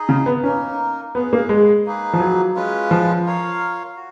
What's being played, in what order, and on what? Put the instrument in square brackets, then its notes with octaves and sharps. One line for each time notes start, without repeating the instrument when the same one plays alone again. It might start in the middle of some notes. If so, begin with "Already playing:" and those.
Already playing: [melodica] D#4 G#4 D#5
[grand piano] C#3
B3
[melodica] A#3 D#4 A#4 [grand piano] C#4
[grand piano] B3 [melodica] C#4 G#4 B4
[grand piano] A#3
G#3
[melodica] A#3 D#4 G#4 B4
[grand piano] F3
F#3
[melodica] G#3 C#4 F4 B4
[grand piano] F3
[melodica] F4 A#4 C#5 F5
F#4